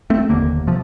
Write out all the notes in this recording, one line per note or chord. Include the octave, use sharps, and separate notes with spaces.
A3 C4
F1 D#2 D3 A#3
C3 F3